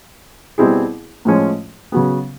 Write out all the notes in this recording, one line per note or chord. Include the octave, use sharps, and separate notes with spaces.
B2 G3 C4 E4 G#4
A2 F3 G#3 C#4
C#3 F#3 B3